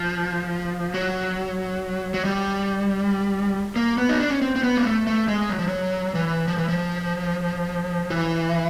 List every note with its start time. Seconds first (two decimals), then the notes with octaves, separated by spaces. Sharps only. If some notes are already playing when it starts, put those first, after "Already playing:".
Already playing: F3
0.94 F#3
2.14 F#3
2.25 G3
3.76 A#3
3.98 B3
4.09 D#4
4.20 D4
4.30 C#4
4.42 C4
4.56 C4
4.63 B3
4.77 A#3
4.85 A3
5.07 A3
5.28 G#3
5.50 F#3
5.59 F3
5.67 F#3
6.15 E3
6.48 F3
6.58 E3
6.68 F3
8.10 E3